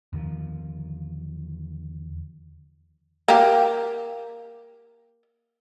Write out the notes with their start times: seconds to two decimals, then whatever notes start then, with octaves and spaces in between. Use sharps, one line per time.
0.13 E2 D3 D#3 F3
3.28 A#3 G4